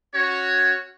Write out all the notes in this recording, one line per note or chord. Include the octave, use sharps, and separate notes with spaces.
C#4 F#4 C#5